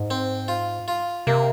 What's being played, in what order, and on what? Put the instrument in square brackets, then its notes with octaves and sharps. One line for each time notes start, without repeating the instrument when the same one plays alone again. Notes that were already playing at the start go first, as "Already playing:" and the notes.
Already playing: [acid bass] G#2
[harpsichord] C4
F4
F4
[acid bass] C3 [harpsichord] A#3